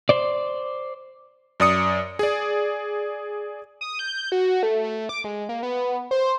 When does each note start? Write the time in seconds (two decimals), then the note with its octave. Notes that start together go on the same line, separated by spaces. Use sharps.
0.09 C5 D5
1.60 F#2 D5 D#6 C#7
2.19 G#4 D5
3.81 D#6
3.99 G6
4.32 F#4
4.63 A3
4.84 A3
5.09 D6
5.24 G#3
5.49 A#3
5.63 B3
6.11 C5